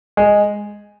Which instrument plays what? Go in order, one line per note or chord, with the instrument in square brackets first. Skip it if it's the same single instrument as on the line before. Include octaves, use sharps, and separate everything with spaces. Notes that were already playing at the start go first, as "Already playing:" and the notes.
[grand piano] G#3